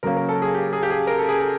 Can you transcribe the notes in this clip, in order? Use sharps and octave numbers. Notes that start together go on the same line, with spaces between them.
C#3 F#3 A#3 C#4 A#4
A#4
A4
G#4
G4
G#4
G4
G#4
A#4
A4
G#4
A4